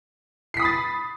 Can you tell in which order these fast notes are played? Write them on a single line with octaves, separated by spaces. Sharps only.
C7 B6 D#6 B5 A6